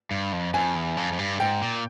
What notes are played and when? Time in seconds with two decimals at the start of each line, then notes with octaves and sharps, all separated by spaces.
0.11 G2
0.33 F2
0.54 F2 G#5
0.75 E2
0.97 F2
1.12 F2
1.19 G2
1.40 G#2 G5
1.62 A#2